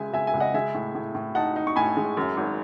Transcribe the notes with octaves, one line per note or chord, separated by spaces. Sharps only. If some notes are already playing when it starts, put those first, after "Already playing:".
Already playing: C#2 C#3 G#3 E5 G#5
C#2 E5 G#5
E5 G#5
C#2
D#5 F#5
G#3 E5 G#5
A2
A2
A2
D#4 F#5 A5
D#4
C#6
A2 G#5 B5
G#3
F#2
G#1